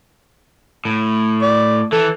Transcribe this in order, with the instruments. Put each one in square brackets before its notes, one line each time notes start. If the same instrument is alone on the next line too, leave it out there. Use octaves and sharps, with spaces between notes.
[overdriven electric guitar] A2
[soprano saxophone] D5
[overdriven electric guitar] E3 [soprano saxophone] A4